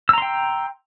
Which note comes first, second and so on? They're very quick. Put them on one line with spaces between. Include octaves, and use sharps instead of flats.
E6 A#5 C6 G5